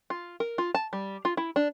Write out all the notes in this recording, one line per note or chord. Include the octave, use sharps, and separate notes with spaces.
F4
A#4
F4
A5
G3
F4
E4
D4